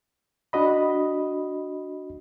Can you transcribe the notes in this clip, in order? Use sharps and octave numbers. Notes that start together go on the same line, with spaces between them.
D4 F#4 D#5 B5